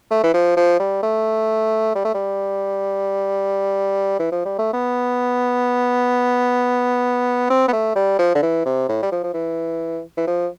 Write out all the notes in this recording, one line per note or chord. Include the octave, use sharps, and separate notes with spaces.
A3
E3
F3
F3
G3
A3
G3
A3
G3
E3
F3
G3
A3
B3
C4
B3
A3
G3
F3
D3
E3
C3
A2
G3
F3
F3
E3
E3
F3